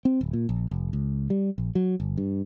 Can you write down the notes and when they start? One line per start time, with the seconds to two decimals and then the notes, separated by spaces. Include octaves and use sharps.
0.05 C4
0.21 D1
0.33 A#2
0.49 A#1
0.71 F1
0.93 C#2
1.30 G3
1.58 A#1
1.75 F#3
2.00 G1
2.17 G2